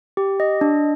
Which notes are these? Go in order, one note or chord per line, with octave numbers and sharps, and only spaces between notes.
G4
D#5
D4